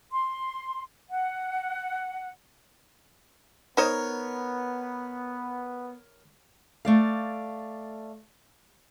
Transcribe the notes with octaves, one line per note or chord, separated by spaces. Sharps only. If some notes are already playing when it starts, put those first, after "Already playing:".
C6
F#5
B3 D#4 A#4 C5 C#5 D#5
A3 D5 F5